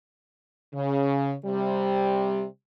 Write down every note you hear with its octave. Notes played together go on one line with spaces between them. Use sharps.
C#3
C3 G3